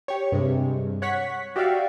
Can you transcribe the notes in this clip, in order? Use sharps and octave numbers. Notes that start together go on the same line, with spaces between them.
G4 C#5
G2 C3 G#3
C#5 F#5 C#6 B6
F#4 G4 D5 E5 F5